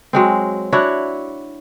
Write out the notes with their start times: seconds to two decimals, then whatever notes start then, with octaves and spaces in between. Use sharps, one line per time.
0.13 F#3 G#3 C4
0.72 D4 E4 F#4 C#5